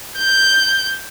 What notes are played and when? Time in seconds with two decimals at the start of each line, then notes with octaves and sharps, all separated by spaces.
0.18 G6